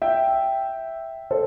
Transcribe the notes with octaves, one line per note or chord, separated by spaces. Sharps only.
E5 G5
A4 C5